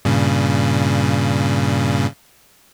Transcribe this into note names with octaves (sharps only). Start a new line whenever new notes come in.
G2 A#2 C#3